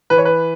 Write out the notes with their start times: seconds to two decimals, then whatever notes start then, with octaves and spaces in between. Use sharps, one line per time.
0.10 E3 B4
0.18 C#5
0.25 B4